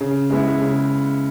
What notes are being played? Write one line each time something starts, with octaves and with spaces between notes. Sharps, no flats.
C#3
G#3 B3 E4
C#3